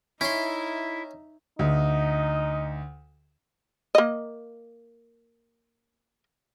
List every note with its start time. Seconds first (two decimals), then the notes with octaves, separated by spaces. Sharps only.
0.21 C#4 D#4 E4 E5 C6
1.59 D2 D#4
3.95 A#3 D#5